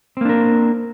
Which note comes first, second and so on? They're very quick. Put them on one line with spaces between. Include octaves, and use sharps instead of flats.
C4 A#3 D4 A#4